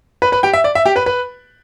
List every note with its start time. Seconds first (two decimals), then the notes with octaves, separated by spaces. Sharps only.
0.22 B4 B5
0.32 B4 B5
0.43 G4 G5
0.53 E5
0.64 D5
0.75 E5
0.86 G4 G5
0.96 B4 B5
1.06 B4 B5